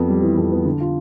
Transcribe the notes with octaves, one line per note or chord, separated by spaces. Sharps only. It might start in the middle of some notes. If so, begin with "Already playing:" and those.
Already playing: F2 B3
G3
E3
F2
B3
D3
F4